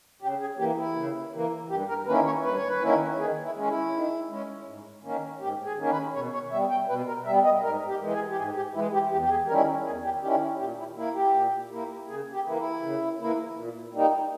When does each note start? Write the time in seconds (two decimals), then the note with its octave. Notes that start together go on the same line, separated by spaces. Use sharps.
0.22 C#3 G4
0.40 G#4
0.59 E3 A#3 G4
0.77 E4
0.96 C#3
1.33 E3 A#3
1.70 G2 G4
1.88 A#4
2.07 D#3 A#3 C#4 E4 B4
2.25 C#5
2.44 G2 B4
2.56 C#5
2.68 B4
2.81 D#3 A#3 C#4 E4
3.18 D#3 G#4
3.43 E4
3.55 G#3 C#4
3.68 E4
3.93 D#3
4.29 G#3 C#4
4.67 G#2
5.04 D#3 A#3 C#4
5.41 G#2 G4
5.65 G#4
5.78 D#3 A#3 C#4
5.90 B4
6.15 B2 C#5
6.33 C#5
6.52 G3 E5
6.54 B3
6.70 G5
6.89 B2 B4
7.07 A#4
7.26 G3 B3 E5
7.44 D#5
7.63 G#2 A#4
7.88 G4
8.00 E3 G#3
8.13 G#4
8.30 G4
8.37 G#2 G#4
8.56 G4
8.74 E3 G#3 E4
8.93 G4
9.11 E2 G4
9.23 G4
9.30 G#4
9.48 D#3 G3 C#4 E4 A#4
9.86 E2 G#4
10.04 G4
10.22 D#3 G3 C#4 E4 G4
10.41 E4
10.59 A#2 G4
10.78 E4
10.97 A#3 E4
11.15 G4
11.34 A#2
11.71 A#3 E4
12.08 C#3 G#4
12.33 G4
12.45 E3 A#3 E4
12.57 E4
12.82 C#3
13.19 E3 A#3 E4
13.56 A#2
13.93 G3 A#3 D#4